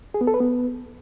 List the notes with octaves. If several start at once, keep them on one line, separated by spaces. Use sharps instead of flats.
G#4
B3
A4
B4
B3